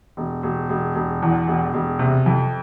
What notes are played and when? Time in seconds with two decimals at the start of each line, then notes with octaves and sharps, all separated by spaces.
0.17 E1
0.43 E1
0.69 E1
0.95 E1
1.22 E2
1.47 E1
1.74 E1
1.99 C3
2.26 F2